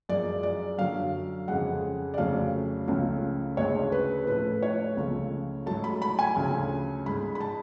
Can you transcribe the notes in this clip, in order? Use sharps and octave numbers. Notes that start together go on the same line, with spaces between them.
F#2 F3 G#3 D5
D5
F#2 D3 F#3 F5
F2 C#3 G#3 F#5
D5
F2 C#3 F#3 A3 F5
C#2 C#3 F3 A3
D2 C#3 G#3 C#5
B4
A2 F3 A3 B4
C#5
C#2 C#3 F3 A3
G#2 F#3 A3 A5
B5
B5
G#5
D2 C#3 F3 A3
G#2 G#3 B5
B5
A5